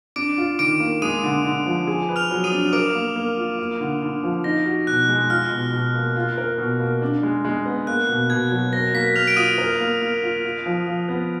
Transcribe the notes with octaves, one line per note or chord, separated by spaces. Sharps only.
D4 D6 D7
F4
D#3 D6 D7
A#3
G#3 D#6 D#7
D3
D3
F3
G#4
B4
F6 F7
F#3
D#6 D#7
D4
A#4 D6 D7
A#3
A#3
F4
A#3
D3
D3
F3
D#4 A#6
F#4
B2 F#6
G#3
F4 F6
B2
B2
A#3
F4
A#4
B2
A#3
D4
G#3
G#3
B3
A#3 F#6
B2
B2 G#6
F#3
A#4 A#6
A#3 B6
A#3 F6 F7
D7
F4 D#6 D#7
A#4
A#3
A#3
F4
F4
F3
F3
B3